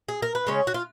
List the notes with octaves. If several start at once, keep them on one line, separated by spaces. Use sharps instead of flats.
G#4
A#4
B4
C#3 G#3 C#4 C#5
F#4
F4